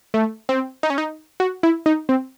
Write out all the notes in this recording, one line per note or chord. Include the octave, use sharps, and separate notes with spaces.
A3
C4
D#4
C#4
D#4
F#4
E4
D#4
C4